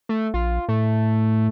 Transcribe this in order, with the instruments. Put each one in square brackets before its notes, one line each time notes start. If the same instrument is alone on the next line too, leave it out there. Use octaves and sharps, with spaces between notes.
[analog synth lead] A3
[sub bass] A#1 [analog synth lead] F4
[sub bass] A2 [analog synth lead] A3